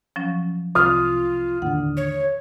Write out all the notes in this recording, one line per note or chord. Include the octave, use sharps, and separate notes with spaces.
F3 F#3 C#4
C2 F4 D#6 F6
D#2 A2 D3 F#5
C#5